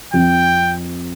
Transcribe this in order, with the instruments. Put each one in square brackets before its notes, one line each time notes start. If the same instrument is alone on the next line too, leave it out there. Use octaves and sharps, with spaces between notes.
[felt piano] F2 [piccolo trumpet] G5